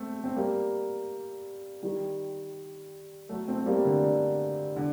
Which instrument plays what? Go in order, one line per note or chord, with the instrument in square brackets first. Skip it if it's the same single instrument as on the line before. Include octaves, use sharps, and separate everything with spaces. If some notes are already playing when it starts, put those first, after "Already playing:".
Already playing: [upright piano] A3 C4
C4
G3 A#3
D#3 G3
F#3 A3
A3 C4
C4
G3 A#3
D3
D3
D3